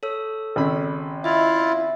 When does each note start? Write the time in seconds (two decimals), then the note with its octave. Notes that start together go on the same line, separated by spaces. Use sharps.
0.03 A4 C#5 E6
0.56 G#1 C#3 B5
1.24 E4 F4 D#5 E5
1.60 E5